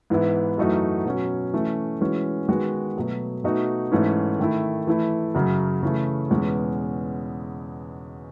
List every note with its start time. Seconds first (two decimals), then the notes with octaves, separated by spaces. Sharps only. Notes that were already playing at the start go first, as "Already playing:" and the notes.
0.10 G#2 E3 B3 E4
0.58 F#2 E3 A3 D#4 F#4
1.05 B2 F#3 C#4
1.54 E3 A3 C#4
2.01 E3 G#3 C#4 F#4
2.49 D#3 G#3 B3 F#4
2.96 B2 F#3 A3
3.44 B2 A3 D#4 F#4
3.92 G#2 E3 A3 C#4
4.39 D#3 A3 E4
4.87 E3 A3 E4
5.35 F#2 C#3 F#3
5.83 C#3 E3 A3
6.30 E2 B2 G#3 C#4 F#4